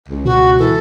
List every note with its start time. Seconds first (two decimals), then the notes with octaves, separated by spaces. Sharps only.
0.09 C#2
0.25 B2 F#4
0.59 E3 A4